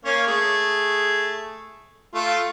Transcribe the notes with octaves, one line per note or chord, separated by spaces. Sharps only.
A#3 C#4 C#5
A3 G#4
A3 F4